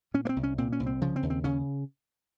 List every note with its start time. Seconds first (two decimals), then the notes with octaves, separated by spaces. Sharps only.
0.14 A#2 C#4
0.25 A#3
0.29 C4
0.36 C2
0.43 C#4
0.58 A#2 C4
0.72 C#4
0.80 C2
0.86 C4
1.01 C#3 F3
1.16 C4
1.23 D#2
1.30 C4
1.44 C#3 C#4